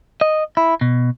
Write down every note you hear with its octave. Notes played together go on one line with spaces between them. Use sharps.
D#5
E4
B2